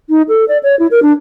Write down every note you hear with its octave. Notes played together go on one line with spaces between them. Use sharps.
D#4
A4
D5
C#5
E4
A#4
D4